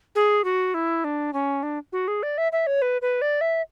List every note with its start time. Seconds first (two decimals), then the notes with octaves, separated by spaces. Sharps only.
0.15 G#4
0.44 F#4
0.74 E4
1.04 D4
1.33 C#4
1.63 D4
1.93 F#4
2.08 G#4
2.23 D5
2.38 E5
2.52 E5
2.67 C#5
2.82 B4
3.02 B4
3.22 D5
3.41 E5